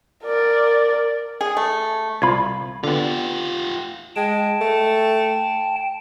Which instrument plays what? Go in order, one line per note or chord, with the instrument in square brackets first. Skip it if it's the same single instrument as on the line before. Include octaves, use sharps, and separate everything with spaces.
[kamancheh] A#4 D5
[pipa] G#4
A3
[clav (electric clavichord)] C2 F4 [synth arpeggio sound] B5 G#6
[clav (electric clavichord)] D3 B3 [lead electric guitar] F4 G4
[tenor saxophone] G#3 [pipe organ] G5 A5
[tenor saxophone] A3